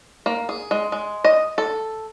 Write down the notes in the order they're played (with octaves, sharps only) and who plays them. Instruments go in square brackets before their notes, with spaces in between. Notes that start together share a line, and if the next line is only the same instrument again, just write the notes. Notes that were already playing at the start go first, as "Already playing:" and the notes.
[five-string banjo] A#3
G#4
G#3
G#3
D#5
A4